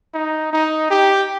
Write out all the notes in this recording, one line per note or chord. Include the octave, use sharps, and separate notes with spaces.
D#4
D#4
G4